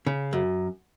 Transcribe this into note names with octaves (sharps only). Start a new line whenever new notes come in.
C#3
F#2